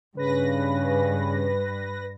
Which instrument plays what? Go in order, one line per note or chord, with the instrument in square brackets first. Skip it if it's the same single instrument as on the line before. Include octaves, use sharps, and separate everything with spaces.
[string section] G2 [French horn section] C#3 [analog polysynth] B4 A#6